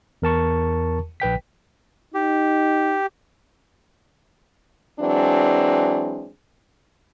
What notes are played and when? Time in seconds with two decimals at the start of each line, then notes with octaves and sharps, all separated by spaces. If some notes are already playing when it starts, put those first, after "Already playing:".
0.22 E2 A#4 A5 C#6
1.20 A#1 B4 G5 B6
2.14 D#4 G4
5.00 E3 F#3 G#3 C4 D4